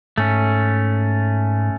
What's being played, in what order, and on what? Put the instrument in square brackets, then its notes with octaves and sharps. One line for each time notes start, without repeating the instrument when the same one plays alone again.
[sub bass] G#2 [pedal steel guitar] A3 C#4